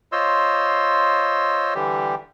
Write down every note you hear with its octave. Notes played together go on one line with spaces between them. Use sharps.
F4 C5 C#5 D#5 C6 E6
D3 E3 G3 G4